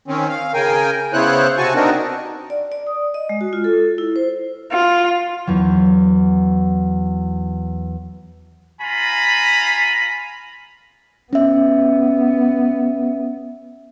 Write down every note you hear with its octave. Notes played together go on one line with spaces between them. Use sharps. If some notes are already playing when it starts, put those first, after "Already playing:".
D#3 C4 C#4
F5
C#3 A#4 G5 G#5
C#3 B3 E4 C5 C#5 F#6
C3 C4 F#4 G#5 A5 C#6
B3 C4 D4 D#4 F#4 A#4
D5
D5
D#6
D#5
G#3
F#4
F4
A4
E4
C5
F4
E2 F#3
F4 G#5 A#5 B5
B3 C#4 E5